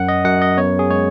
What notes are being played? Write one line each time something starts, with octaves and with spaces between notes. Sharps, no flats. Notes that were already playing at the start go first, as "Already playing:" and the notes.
Already playing: F#2 F#5
D#5
F#2 F#5
D#5
B3 C#5
G#4
G#3 C#5